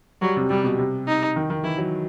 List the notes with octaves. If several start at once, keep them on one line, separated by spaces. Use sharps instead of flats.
F#3 G3
C3
C3 G3
B2
C3
D#4
D#3
D#3
E3 E4
F#3